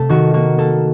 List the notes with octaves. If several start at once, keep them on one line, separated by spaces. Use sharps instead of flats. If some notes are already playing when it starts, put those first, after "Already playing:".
Already playing: C3 A3 A4
D#3 F#4
A#3 F#4
A#3 A4